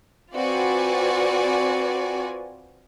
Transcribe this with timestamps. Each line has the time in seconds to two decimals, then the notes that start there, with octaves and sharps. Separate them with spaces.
0.35 C4 F4 F#4 B4 D5 G#5